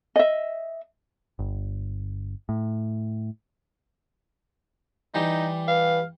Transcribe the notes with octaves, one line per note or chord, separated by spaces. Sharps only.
D#5 E5
G1
A2
E3 G3 D#4 G4
B4 F5